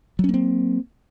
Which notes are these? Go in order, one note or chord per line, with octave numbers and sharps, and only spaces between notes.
F#3 A#3 C4 C#4